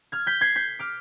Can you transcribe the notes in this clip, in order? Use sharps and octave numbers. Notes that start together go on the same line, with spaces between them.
F6 G#6
G6 B6
G#6 C7
G6 B6
D6 F6